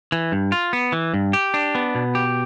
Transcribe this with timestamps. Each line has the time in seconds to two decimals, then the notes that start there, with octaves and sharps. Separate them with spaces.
0.12 E3
0.32 G2
0.52 F4
0.73 B3
0.92 E3
1.14 G2
1.33 G4
1.54 D4
1.75 B3
1.95 B2
2.15 G4